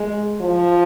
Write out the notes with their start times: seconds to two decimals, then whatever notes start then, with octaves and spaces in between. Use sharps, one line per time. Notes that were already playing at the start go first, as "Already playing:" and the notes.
Already playing: G#3
0.41 F3